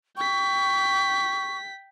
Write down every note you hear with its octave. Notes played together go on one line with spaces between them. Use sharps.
G5 C#6 B6